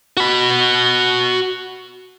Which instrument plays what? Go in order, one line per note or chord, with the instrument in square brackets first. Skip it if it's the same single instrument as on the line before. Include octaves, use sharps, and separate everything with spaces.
[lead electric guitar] F#4 B5